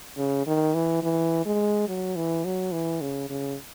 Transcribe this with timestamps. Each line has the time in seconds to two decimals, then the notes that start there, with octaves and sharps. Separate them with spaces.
0.17 C#3
0.47 D#3
0.74 E3
1.03 E3
1.46 G#3
1.88 F#3
2.16 E3
2.45 F#3
2.72 E3
3.01 C#3
3.30 C#3